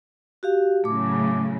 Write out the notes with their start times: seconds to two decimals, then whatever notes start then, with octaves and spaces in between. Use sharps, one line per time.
0.43 F#4 G4 F5
0.84 A2 C#3 F#3 A3 D6